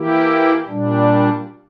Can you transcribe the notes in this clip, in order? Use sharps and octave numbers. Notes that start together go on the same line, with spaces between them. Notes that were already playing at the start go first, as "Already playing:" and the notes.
Already playing: E3 A#3 E4 G4
A#2 G3 D4